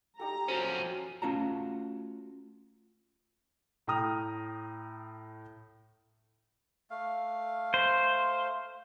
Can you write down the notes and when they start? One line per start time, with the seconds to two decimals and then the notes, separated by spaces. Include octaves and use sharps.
0.19 D#4 G4 A4 A#5
0.48 F3 C#4 F#4 C5
1.22 A3 C#4 F4 F#4 A5 A#5
3.87 A2 G5 A#5 D#6 F6
6.91 A3 F5
7.74 C5